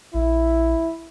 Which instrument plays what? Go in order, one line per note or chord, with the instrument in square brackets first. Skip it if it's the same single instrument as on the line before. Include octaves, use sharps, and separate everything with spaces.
[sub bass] A#1 [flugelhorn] E4